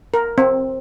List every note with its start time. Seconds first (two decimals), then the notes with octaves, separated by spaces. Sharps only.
0.14 A#4
0.38 C4